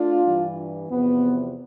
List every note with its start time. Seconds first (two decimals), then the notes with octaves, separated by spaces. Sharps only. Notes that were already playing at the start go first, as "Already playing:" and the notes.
Already playing: A3 D4 F4
0.25 G2 E3 G3
0.89 E2 C3 F3 B3